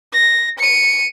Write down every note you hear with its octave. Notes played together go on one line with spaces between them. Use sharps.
A#6
C#7 D#7